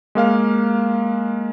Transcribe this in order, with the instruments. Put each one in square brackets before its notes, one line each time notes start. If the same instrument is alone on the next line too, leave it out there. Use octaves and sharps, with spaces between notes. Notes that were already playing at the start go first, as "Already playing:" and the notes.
[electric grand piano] G#3 A#3 F5 F6